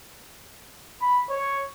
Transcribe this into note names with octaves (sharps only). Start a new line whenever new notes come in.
B5
C#5